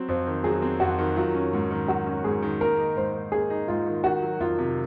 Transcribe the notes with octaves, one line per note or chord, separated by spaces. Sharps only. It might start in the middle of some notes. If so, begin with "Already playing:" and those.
Already playing: F#3 C4
F2 C5
D#3
F#3 G#4
C4
F2 F#4
D#3
F#3 F4
C#4
G#2
D#3
F#3 F#4
C#4
G#2 G#4
D#3
A#3 A#4
D#4
G#2 C5
D#3
A#3 G#4
D#4
G#2 F4
D#3
D#3 F#4
F#3
F2 F4
C3